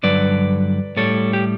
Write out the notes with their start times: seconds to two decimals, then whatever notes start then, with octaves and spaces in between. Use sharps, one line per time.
0.03 G2 D3 F#3 B4 D5
0.97 A2 G3 A4 C#5
1.33 G4